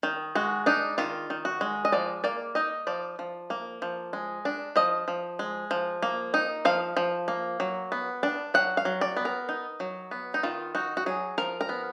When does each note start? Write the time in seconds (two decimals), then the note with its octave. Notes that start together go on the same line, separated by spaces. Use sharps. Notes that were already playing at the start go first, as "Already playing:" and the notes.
0.03 D#3
0.35 G#3 F#4
0.66 D4 D#4
0.98 D#3 F4
1.30 D#3
1.45 F#4
1.61 G#3
1.85 D#5
1.92 F3 D5
2.24 A#3 D5
2.55 D#4 D#5
2.87 F3 D5
3.19 F3
3.50 A#3
3.82 F3
4.13 G#3
4.45 D4
4.76 F3 D#5
5.08 F3
5.39 G#3
5.71 F3
6.02 A#3
6.34 D#4
6.65 F3 F5
6.97 F3
7.28 A#3
7.60 F#3
7.92 B3
8.23 D4
8.54 F#3 F#5
8.77 F5
8.85 F#3
9.01 D5
9.17 B3
9.25 A#4
9.49 D#4
9.80 F#3
10.11 B3
10.34 D#4
10.43 D#3 F4
10.75 D#4 F#4
10.97 F#4
11.06 F#3 G#4
11.38 F3 A#4
11.61 A#4
11.69 B3